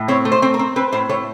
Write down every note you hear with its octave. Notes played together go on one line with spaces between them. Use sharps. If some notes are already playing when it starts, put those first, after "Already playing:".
Already playing: A2
C4 C#5
A3
C5
C4
A#4
C4
C4 B4
A2 C5
A3 C#5